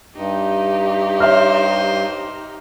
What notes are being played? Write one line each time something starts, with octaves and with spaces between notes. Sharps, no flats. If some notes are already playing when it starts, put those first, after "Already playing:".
G2 D#4 G4
C5 C#5 E5 F6